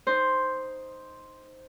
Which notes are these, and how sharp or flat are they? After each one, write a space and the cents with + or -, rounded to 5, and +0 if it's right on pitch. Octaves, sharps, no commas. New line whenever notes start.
D#4 +0 C5 +0